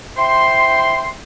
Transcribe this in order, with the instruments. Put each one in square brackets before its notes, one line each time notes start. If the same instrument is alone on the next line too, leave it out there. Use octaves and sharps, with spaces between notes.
[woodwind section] E4 C5 G5 C6